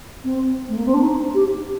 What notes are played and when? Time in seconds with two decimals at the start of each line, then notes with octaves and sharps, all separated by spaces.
0.24 C4
0.69 A3
0.77 A#3
0.86 C4
0.94 D4
1.02 D#4
1.34 G4